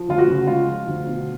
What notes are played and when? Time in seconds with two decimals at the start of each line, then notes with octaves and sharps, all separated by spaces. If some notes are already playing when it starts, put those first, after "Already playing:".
Already playing: F3
0.08 D2 F4
0.18 F#4
0.28 C#3
0.47 G#3 F4
0.67 F3
0.87 D2
1.07 B2